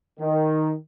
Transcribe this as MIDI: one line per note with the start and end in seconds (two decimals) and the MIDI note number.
0.20 0.74 51